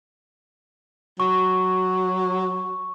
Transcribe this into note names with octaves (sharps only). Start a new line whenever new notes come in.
F#3 C#6